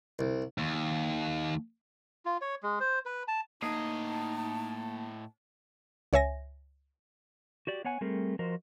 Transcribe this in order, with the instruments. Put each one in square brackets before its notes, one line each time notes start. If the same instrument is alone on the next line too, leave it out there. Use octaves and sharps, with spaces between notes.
[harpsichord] C2
[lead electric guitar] D#2
[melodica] F4
C#5
G#3
C5
B4
A5
[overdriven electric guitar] A2 D#5 [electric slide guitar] A#3 G#4 [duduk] D#4 [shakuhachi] A5
[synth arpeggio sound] C#2 C#5 E5 G#5 A#6
[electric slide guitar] F#4 G4 D5
B3 C#5 F#5 G#5
G3 A3 C4 G#4 A#4
F3 F#4 A#4 C5 D#5